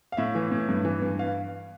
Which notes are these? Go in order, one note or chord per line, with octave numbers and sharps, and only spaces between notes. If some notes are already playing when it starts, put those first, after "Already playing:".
F5
A2 E5
E3
A2
G2
E3
G2
F5